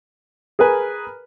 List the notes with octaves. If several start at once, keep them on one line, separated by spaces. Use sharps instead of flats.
G#4 A#4 B4 G#5